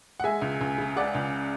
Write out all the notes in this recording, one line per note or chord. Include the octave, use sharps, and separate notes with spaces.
F#5
G#3 E5 G#5
C#2
C#2
C#3
G#3 D5 F#5
C#2